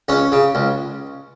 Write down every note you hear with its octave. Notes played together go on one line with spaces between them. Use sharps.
C#2 C#4
C#3
C#2